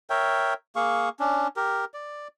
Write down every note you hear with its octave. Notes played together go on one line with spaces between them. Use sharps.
A#4 C#5 E5 G5
A#3 G#4 F5 C#6
C#4 D4
G4 A#4
D5